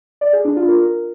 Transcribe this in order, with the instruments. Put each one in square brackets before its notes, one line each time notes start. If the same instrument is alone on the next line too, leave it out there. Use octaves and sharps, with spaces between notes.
[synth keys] D5
G#4
D4
F4
A#4